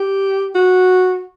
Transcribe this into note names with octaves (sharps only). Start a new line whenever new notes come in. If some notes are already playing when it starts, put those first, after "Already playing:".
Already playing: G4
F#4